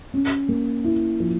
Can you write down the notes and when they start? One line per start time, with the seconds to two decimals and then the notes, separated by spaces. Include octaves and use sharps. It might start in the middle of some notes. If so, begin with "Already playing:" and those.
0.14 C#4
0.49 A#3
0.84 E4
1.20 F3